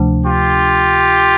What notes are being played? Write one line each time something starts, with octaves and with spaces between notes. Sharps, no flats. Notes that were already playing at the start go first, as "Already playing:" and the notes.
Already playing: D2 C3 F3 A3 D4
F4 G4